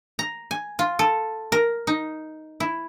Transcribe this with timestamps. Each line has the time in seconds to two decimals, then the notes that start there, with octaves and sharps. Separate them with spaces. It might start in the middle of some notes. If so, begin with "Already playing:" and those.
0.19 A#5
0.51 G#5
0.79 F4
0.99 A4
1.52 A#4
1.87 D#4
2.60 E4